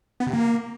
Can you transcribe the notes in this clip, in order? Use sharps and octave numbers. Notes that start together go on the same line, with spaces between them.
B3
C3
A#3